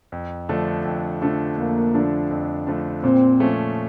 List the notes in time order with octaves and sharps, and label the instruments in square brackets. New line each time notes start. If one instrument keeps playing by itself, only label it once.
[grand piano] F2
D3 F3 A3 D4
F2
D3 F3 A3 D4
[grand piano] F2 [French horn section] A#3
[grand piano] D3 F3 A3 D4
F2
D3 F3 A3 D4
[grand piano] A#2 [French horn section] C4
[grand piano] F3 A3 C#4